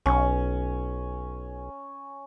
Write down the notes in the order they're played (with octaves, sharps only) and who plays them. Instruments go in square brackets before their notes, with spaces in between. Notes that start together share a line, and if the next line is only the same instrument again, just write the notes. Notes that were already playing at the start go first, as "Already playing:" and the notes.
[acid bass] B1 [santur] C#4